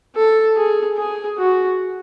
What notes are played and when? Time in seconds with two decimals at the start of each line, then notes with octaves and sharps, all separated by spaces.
0.16 A4
0.56 G#4
0.97 G#4
1.38 F#4